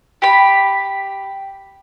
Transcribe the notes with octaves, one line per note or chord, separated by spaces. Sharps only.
G4 B5